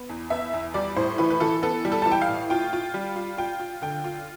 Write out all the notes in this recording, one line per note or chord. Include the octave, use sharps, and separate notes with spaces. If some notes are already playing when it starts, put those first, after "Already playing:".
Already playing: B3
E2
B3 E5
E2
G3 D5
A2 C5
E3 B4
B4
E3 A4
B3 A4
G3
A4
E3 A5
G5
F5
A2
F4 G5
F4
G3
F4
F4 G5
F4
D3 G5
F4